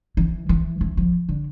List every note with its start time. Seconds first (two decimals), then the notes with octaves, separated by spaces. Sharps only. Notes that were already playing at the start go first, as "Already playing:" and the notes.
0.17 E3
0.49 E3
0.81 E3
0.97 F3
1.29 D3